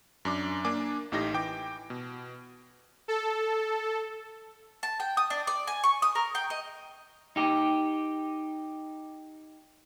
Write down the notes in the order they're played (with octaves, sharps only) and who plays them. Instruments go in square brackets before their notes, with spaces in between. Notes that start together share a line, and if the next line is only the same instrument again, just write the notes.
[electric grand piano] F#2 D4 D6
A#3 D4 G#5 D6
A1 A2 D#4 G4 A#6
E3 G5 D6
B2
[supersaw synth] A4
[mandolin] A5
G5
D#6
D4
D5
G#5
C#6
D#6
A#4
G5
D#5
[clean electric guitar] D#4 G4